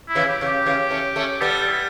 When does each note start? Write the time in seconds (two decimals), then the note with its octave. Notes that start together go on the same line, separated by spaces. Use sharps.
0.09 E4
0.15 C#3 E3
0.28 G4
0.41 C#3
0.47 G4
0.66 C#3 E3
0.91 A3 C#4
1.16 A3 C#4
1.41 G3 B3 A4
1.60 A4
1.69 E4